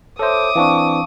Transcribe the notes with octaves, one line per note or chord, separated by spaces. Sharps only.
A4 C5 C#5 E5 D6 D#6
E3 C4 D4 F5 A5 C#6